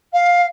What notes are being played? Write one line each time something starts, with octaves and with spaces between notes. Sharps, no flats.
F5